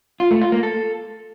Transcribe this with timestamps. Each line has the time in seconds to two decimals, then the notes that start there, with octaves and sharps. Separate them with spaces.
0.20 F4
0.31 A3
0.41 F4
0.52 A#3
0.63 A4